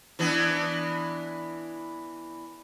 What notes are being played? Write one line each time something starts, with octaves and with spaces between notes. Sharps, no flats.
E3 B3 D4